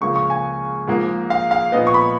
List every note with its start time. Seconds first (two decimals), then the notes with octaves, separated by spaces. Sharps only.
0.01 C#2 C#3 F3 A#3 C#6
0.16 C#6
0.30 G#5
0.88 G#2 F3 A#3
1.30 F5
1.51 F5
1.72 A#2 F3 B3 D#5
1.87 C#6
1.94 B5